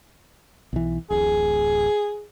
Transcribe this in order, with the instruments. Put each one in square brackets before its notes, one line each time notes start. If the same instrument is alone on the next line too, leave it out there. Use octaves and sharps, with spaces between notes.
[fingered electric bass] B1 E3
[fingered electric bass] D1 A1 [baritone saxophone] G#4